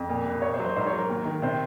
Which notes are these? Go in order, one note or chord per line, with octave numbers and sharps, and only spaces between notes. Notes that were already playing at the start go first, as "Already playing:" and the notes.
Already playing: F2
A#2
C2
A#2 C#5
C5
F#3
C5
G#2 C5
C#5
F#3
A#4
D#2
D#3
C3 C5